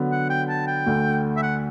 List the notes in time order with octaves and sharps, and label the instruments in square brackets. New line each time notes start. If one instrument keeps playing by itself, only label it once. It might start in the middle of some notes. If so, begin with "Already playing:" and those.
Already playing: [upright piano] D3 F#3 B3
[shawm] F#5
G5
A5
G5
[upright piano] D2 D3 A3
[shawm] E5
F#5